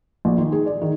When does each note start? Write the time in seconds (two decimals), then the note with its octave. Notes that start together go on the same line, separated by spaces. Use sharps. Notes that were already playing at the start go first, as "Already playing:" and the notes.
0.25 A#1
0.38 D#3
0.52 G#4
0.66 D5
0.81 D#3